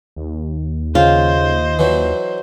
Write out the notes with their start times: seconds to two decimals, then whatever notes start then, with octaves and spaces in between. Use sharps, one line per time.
0.16 D#2
0.95 C#3 F4 C5 D#5
1.79 E3 F#3